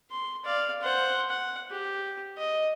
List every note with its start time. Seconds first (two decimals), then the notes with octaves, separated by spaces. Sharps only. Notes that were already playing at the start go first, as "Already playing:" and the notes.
0.11 C6
0.45 D5 F5
0.81 C5 F#5
1.30 F#5
1.70 G4
2.38 D#5